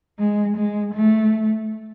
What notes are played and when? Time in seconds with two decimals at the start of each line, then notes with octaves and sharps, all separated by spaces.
0.19 G#3
0.56 G#3
0.94 A3